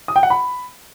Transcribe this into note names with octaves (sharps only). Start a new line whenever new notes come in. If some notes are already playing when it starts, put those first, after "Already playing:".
D#6
G5
F#5
B5